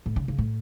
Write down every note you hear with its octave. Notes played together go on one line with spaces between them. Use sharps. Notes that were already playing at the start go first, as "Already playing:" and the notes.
A2
C#3
C#3
A2